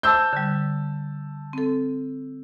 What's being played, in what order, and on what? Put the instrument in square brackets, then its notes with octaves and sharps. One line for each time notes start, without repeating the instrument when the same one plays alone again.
[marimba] C5 C6 D6 [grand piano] A5 E6 G6
[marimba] D3 G3
C4 A4